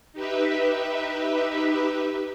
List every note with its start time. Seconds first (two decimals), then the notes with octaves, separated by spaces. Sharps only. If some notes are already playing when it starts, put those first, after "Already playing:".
0.13 D#4 G4 B4 E5